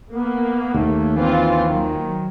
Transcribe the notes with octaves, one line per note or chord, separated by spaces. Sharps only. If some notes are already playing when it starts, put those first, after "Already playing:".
A#3 B3
D#2 A3
E3 C4 F4
D#3 F#3